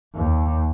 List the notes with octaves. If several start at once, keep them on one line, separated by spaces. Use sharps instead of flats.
D#2